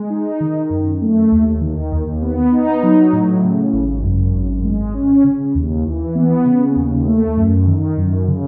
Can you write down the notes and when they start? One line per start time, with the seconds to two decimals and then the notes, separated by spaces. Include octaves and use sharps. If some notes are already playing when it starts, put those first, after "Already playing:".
Already playing: G#3
0.10 D#4
0.40 D#3
0.70 F#2
1.02 A3
1.32 D#2
1.61 D#3
1.92 D#2
2.22 B3
2.52 D#4
2.83 F#3
3.13 A2
3.42 C#3
3.73 G#1
4.03 F#2
4.34 G#1
4.65 G#3
4.94 C#4
5.24 C#3
5.55 D#2
5.85 E3
6.15 B3
6.45 C#3
6.76 D#2
7.06 A3
7.37 F#2
7.67 D#3
7.98 F#2
8.28 C#3